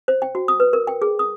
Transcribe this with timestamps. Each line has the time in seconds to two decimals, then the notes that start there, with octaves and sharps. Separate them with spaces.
0.08 C5
0.22 G5
0.35 F#4
0.48 D#6
0.60 B4
0.73 A#4
0.87 G5
1.02 G#4
1.19 D#6